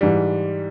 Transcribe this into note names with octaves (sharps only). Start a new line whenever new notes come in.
G#2 E3 G3